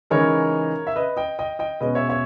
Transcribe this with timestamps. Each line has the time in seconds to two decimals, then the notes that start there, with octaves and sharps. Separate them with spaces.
0.10 C#3 E3 G#3 D#4 A#4 C#5
0.87 E5
0.96 B4 D#5
1.17 D#5 G5
1.39 D#5 G5
1.59 D#5 G5
1.81 B2 G#3 C#4 B4 D#5
1.95 C#5 E5
2.09 C#5 E5